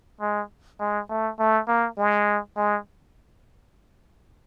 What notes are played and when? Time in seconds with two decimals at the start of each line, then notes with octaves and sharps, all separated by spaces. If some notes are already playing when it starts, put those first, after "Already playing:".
0.21 G#3
0.80 G#3
1.10 A3
1.39 A3
1.68 A#3
1.98 G#3
2.57 G#3